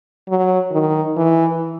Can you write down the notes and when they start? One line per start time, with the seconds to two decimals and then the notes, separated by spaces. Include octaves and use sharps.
0.28 F#3
0.72 D#3
1.16 E3